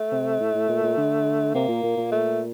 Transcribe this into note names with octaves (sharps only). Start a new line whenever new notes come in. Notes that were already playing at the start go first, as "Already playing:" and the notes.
Already playing: A3
C3
A2
A2
A#2
A#2
D3
C3 A#3
A#2
A#2
A#2
A3